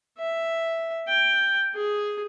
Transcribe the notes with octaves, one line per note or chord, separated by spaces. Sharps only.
E5
G5
G#4